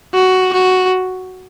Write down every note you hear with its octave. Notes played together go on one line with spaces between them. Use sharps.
F#4
F#4